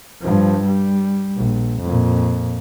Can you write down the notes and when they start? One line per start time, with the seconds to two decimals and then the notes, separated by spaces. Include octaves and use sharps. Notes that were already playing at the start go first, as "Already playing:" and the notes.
0.22 G2 F3
0.66 G3
1.37 A#1
1.81 F2 A#2